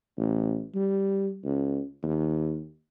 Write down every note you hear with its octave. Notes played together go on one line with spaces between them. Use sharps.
A1
G3
C#2
D#2